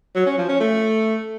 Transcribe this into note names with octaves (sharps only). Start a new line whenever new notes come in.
F#3
C#4
F3
C#4
A3